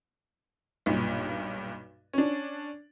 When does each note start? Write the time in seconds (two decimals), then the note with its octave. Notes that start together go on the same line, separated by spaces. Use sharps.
0.86 B1 G2 A#2
2.13 C#4 D4